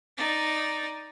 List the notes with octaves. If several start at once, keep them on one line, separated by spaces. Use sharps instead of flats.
D#4 D5